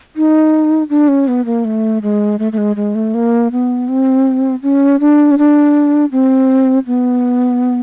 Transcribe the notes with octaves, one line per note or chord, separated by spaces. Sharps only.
D#4
D4
C#4
B3
A#3
A3
G#3
A3
A3
G#3
G#3
A3
A#3
B3
C4
C#4
D4
C#4
D4
C4
B3